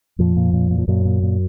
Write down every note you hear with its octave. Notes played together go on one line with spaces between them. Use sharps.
F2 A#2 F3
A#2
A#2
A#2
F3
F#2 A#2 F#3
A#2
A#2